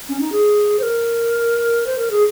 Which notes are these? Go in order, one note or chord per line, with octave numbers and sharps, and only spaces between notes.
C#4
D#4
G#4
C5
A#4
C5
A#4
G#4